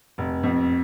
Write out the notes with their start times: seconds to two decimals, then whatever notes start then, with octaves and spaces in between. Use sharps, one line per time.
0.18 F1
0.43 F2